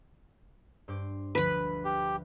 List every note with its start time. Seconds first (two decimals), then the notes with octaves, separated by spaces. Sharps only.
0.88 G2 C5 D6
1.35 D2 D3 F3 B4 B5
1.85 G4